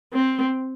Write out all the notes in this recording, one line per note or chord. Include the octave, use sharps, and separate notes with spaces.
C4